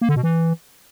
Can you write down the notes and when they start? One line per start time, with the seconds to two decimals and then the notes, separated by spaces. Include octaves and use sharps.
0.01 A#3
0.09 D3
0.16 B2
0.23 E3